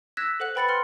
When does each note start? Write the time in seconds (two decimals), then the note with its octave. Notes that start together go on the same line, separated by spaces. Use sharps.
0.17 E6 F#6 G#6 A#6 B6 E7
0.40 A4 C5 F#5 F#6 F#7
0.55 B4 G5 B5 A6 C#7 F#7
0.69 C6 F6 C#7